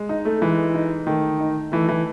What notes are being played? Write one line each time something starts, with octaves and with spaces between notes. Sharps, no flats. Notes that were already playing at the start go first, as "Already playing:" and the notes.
Already playing: G#3
D#4
A3
E3 G#3
D#4
D#3 A3
D#4
E3 A3
E3